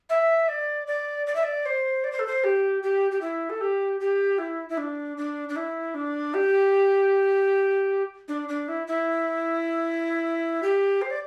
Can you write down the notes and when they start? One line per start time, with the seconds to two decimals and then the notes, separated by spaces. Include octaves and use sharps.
0.09 E5
0.48 D5
0.87 D5
1.27 D5
1.35 E5
1.43 D5
1.66 C5
2.04 D5
2.12 C5
2.19 A4
2.27 C5
2.44 G4
2.83 G4
3.11 G4
3.21 E4
3.50 A4
3.61 G4
4.00 G4
4.38 E4
4.69 E4
4.77 D4
5.17 D4
5.49 D4
5.56 E4
5.94 D4
6.34 G4
8.28 D4
8.48 D4
8.68 E4
8.87 E4
10.63 G4
11.02 C5
11.10 D5